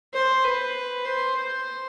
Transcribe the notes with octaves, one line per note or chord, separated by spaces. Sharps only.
C5
B4
C5
C5